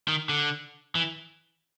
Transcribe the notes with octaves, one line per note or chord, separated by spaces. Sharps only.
D#3
D3
E3